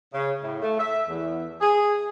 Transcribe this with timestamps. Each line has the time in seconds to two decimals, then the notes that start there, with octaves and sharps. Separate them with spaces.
0.14 C#3
0.42 A2
0.62 A3
0.79 E5
1.09 E2
1.61 G#4